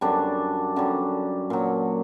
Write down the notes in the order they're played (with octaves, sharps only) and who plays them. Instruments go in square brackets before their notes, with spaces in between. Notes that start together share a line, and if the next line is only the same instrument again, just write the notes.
[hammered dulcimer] F#2 D3 G3 D4
F#2 D3 G3
A#2 F#3